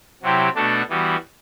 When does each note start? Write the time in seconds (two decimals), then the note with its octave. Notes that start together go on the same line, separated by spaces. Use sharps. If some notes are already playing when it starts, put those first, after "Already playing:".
0.22 C3 F#3 C4 E4 G4
0.55 B2 A3 D4 F#4 A4
0.89 E3 G3 B3 F#4